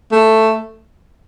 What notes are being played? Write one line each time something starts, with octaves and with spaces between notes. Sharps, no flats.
A3